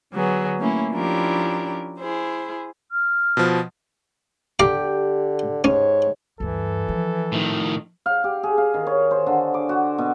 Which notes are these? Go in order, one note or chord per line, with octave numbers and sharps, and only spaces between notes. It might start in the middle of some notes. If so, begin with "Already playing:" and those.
D3 F#3 B3 G#4
A3 A#3 C#4 E4
F3 C#4 D4 E4 G4 A#4
E4 G#4 C5
F6
B2 F3
D3 G4 F5 A#5 D6
G#2 C#4 C#5
D2 G2 E3 A4
F3
A2 D#3
F5
G4
G#4
F5
D#3
C#5
C5
D3
D6
F#4
B2